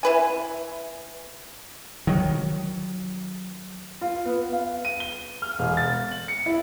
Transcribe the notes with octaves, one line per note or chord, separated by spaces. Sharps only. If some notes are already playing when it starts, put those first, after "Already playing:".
E4 B4 G#5
D#3 F#3
F4
B3
F5
D#7
G7
F6
E1
A6
F#7
C#7
E4